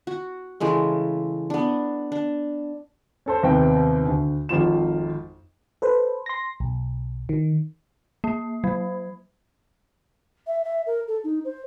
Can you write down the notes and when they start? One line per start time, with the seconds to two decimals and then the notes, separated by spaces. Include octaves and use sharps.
0.07 F#4
0.60 C#3 E3 G#3 A3
1.50 B3 D4
2.12 D4
3.26 C#4 A4 C5
3.43 D#2 C3 B3 C4 G5
4.06 D2
4.49 G#1 F2 F4 E7
5.82 A4 B4 C5
6.26 C6 A#6
6.60 B1
7.29 D#3
8.24 A#3
8.64 F#3
10.47 E5
10.64 E5
10.86 A#4
11.08 A4
11.24 D#4
11.45 C5